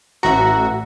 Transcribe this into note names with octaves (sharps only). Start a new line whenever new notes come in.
A1 F#4 E5 A#5